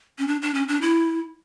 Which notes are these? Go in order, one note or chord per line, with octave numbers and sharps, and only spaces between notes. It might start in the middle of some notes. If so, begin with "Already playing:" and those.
C#4
D4
D4
C#4
D4
E4